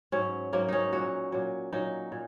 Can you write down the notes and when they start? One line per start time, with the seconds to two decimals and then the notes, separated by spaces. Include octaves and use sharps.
0.12 G#2 F#3 C#4
0.53 G#2 F#3 A#3
0.68 C#4 D#4
0.93 A#2 F#3 F#4
1.32 A#2 F#3
1.73 A#2 F#3 D#4
2.12 A#2